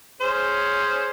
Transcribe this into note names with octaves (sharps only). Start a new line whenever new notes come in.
C#4 G#4 C5